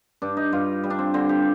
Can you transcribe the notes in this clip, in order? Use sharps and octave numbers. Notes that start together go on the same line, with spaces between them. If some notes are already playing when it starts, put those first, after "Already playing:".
G2 D4
D#4
G2 F4
G3
D4
C4
D3 C4
G4